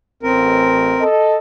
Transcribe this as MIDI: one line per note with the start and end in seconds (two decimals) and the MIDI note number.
0.23 0.94 33
0.23 1.04 60
0.23 1.04 70
1.01 1.37 69
1.01 1.37 75